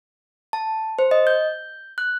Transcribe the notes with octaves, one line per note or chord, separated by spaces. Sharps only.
A5
C5
D#5
G6
F#6